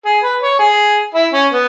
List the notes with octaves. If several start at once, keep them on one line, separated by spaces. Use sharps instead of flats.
G#4
B4
C#5
G#4
E4
C#4
B3